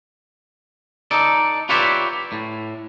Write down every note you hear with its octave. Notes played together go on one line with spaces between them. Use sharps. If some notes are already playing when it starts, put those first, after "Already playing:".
D#4 A4 D5
F4 G4 B4 C#5 D5 E5
A2